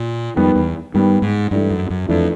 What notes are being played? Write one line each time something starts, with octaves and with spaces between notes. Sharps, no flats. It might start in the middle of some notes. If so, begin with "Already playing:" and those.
Already playing: A#2
F2 D#3 G3 B3
E2
G2 D#3 G3 B3
G#2
G2 E3 A3 D4
F#2
F#2
F2 E3 A3 D4